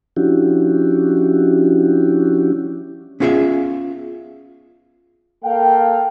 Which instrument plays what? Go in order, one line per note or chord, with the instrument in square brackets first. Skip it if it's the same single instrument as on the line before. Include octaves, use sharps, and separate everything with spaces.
[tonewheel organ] F3 C#4 D4 E4 F#4 G4
[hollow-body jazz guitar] B3 C#4 F4 G#4 E5 F5
[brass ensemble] A#3 A4 F5 G5